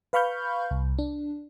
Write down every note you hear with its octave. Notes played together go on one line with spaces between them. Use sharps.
B4 F5 B5 C#6 F6 G6
C2
D4